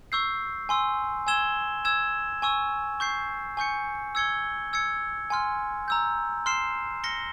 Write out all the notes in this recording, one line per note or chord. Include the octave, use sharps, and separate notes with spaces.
C#6 E6 G6 C7
G#5 C6 E6
G#5 E6 G#6 E7 G7
E6 G#6 E7
G#5 C#6 E6
C#6 G6 C7
G#5 C#6 G6 C#7
E6 G#6 C#7 G7
E6 G#6 C#7
G#5 C6 F6
A#5 E6 G6
C6 F6 C7 E7
F6 A#6 C#7 G7